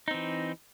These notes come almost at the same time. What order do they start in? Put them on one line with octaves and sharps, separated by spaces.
D#4 C4 E3